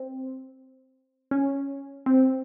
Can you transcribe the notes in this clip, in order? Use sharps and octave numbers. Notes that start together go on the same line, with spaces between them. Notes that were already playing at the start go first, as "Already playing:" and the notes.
Already playing: C4
C#4
C4